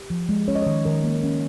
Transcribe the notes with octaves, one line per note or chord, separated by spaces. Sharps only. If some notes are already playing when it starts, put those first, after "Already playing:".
Already playing: G4
F3
G#3
C#4 C#5
D#5
D#3 C#5
D#3 A#4
A#3
C#4